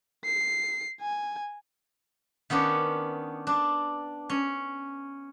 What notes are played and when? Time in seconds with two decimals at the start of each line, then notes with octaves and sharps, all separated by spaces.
0.25 C7
1.01 G#5
2.50 D#3 B3 C#4 D4
3.47 D4
4.29 C#4